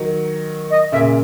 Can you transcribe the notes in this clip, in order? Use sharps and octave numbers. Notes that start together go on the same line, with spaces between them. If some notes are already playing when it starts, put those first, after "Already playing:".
Already playing: D#3 F#3
D#5
A#2 C#3 E5